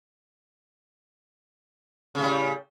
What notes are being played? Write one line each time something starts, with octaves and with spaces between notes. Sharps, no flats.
A2 C#3 G3